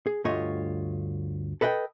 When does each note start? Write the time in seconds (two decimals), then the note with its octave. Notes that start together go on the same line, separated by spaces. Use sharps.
0.07 G#4
0.25 D2 G2 A3 F4 C#5 D#5
1.61 A4 B4 D#5 F5 G5